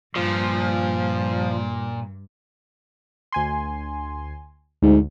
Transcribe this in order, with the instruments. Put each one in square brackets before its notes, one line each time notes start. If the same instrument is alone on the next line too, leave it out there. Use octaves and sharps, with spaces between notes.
[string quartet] G2 [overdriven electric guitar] A#2 [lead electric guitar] F3
[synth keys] D2 G#5 C6
[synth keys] D2 [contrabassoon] G#2